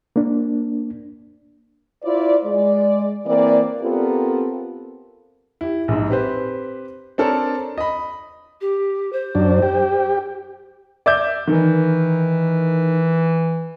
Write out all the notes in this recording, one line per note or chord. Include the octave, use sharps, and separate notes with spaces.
A#3 D4
E4 F4 C5 D5
G#3 D5
E3 A#3 C4 D5
B3 C4 F4 G4 A4 A#4
E4 G4
A#1 G#2
C4 G4 B4 C5
C4 D4 A4 A#4 C#5
D#5 B5
G4
C5
F#2 D4
G4
D5 E5 G6
D#3 E3 A#4